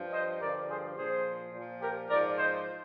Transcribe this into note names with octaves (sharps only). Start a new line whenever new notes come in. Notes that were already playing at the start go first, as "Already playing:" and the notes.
Already playing: G2 F3
C5 D#5
G2 D3 F3 A#4 D5
G#4 C5
A#2 F3 G#4 C5
A#2 F3
G4 A#4
G#2 F3 A#4 D5
C5 D#5